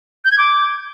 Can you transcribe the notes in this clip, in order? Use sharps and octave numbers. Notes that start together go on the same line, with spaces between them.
G6
G#6
D6